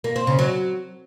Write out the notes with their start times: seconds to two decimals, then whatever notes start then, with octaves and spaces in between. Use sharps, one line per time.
0.04 A#3
0.16 C4
0.27 C#3
0.39 F#3